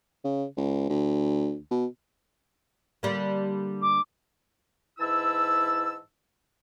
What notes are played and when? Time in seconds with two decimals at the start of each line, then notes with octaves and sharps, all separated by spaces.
0.25 C#3
0.57 C#2
0.89 D2
1.71 B2
3.03 D3 G3 A#3
3.82 D6
4.99 G#2 E3 E4 A5 E6